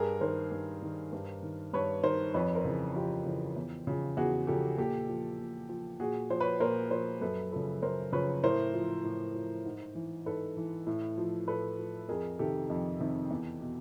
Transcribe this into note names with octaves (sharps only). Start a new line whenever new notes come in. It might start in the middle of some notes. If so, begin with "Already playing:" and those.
Already playing: G2 G#4 A#4
D#3 A#4 C5
G2
D#3
G2
D#3
G2 B4 C#5
D#3 A#4 C5
F2 B4 C#5
A#4 C5
C#3 E3
F2 F4 G4
C#3 E3
E2
C#3 F3
E2 F#4 G#4
C#3 F3 G4 A4
A#2 G4 A4
F3
A#2
F3
A#2 F#4 G#4
F3 C5
B4 C#5
A#2 A#4 C5
F3 A#4 C5
F#2 A4 B4
C#3 F3 A4 B4
F#2 A#4 C5
C#3 F3 B4 C#5
A2 A#4 C5
F3
A2
F3
G#2
E3
G#2 A4 B4
E3
A2
F3
A2 A4 B4
F3
F2 G#4 A#4
C3 D#3 G4 A4
F2
C3 D#3
E2
B2